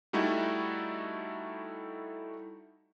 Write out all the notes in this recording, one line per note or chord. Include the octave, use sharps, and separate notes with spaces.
G3 A3 D#4 E4 F#4 A4